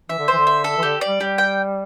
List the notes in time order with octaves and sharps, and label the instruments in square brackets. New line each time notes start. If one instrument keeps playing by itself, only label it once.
[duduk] E3 [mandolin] E5
[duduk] D3
[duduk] E3 [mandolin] C5
[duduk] D3
[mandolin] E5
A4
[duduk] E3
[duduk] D3 [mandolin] G4
[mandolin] D5
[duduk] G3
[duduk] G3 [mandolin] G4
[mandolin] G5